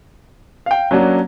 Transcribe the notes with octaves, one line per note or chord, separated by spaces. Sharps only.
F5 G5
F#3 A#3 C#4 D4 F#4